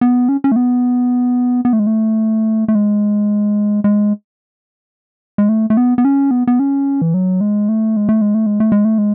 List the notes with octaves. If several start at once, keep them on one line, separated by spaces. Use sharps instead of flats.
B3
C#4
C#4
A3
B3
B3
A3
G#3
A3
A3
G#3
G#3
G#3
A3
A3
B3
B3
C#4
B3
B3
C#4
E3
F#3
G#3
A3
G#3
A3
G#3
A3
G#3
A3
G#3
A3
G#3